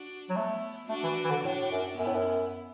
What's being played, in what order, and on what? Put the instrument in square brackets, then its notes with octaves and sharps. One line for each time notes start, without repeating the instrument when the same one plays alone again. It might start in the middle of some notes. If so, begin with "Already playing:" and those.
Already playing: [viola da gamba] D4 F#4
[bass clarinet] F#3
[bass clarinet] A3 [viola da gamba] B3 E4
[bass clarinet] A3 [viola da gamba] D4 F#4
[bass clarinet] E3
E3
D3
[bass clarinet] A2 [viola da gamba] D4 F#4
[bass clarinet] A2
F#2
[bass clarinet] F#2 [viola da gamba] B3 E4
[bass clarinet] A2
F#2